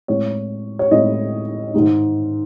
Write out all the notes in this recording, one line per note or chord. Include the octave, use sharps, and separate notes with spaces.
A2 G#3 C4 E4 C#5
C#5
A2 G#3 C4 E4 D#5
G#2 D#3 G#3 D#4